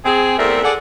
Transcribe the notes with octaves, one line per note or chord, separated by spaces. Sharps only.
C4 G#4
E2 A3 C4 A#4 D5 E5
G#4 A4 D5 F#5